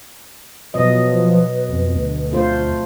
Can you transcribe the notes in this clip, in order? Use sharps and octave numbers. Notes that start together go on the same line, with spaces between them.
B2 F3 F#3 B4 D#5
F2
D2
A3 F4 C5